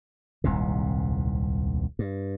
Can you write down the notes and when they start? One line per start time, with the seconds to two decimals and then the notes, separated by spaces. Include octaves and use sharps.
0.44 D#1 C2 G#2 C3
1.99 G2